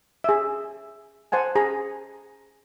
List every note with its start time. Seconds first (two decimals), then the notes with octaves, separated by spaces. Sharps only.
0.24 G#4 E5
1.32 C5 F#5 G#5 A5
1.56 G#4 A#5